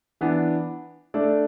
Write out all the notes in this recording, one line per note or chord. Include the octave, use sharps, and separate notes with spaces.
E3 B3 D4
A3 D4 A4 D5